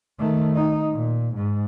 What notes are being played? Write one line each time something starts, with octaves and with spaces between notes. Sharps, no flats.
D#3 A3
D#4
A#2
G#2